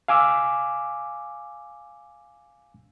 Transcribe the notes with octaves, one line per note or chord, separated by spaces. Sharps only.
F5 G#5 D6 E6